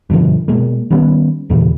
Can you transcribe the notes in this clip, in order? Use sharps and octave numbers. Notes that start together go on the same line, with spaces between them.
G2 B2 D3 F3
B2 G#3 A#3
D#3 G3 B3 C#4
E2 A#2 C#3 E3